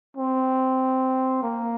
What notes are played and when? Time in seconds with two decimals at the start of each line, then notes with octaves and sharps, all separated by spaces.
0.17 C4
1.43 A#3